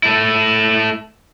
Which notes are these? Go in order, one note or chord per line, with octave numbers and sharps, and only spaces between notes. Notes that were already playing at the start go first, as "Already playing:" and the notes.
A3 E4